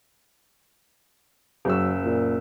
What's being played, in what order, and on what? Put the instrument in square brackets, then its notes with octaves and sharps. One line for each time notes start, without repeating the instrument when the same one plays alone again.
[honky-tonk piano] F#1 E6 [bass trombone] F#3
[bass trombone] A#2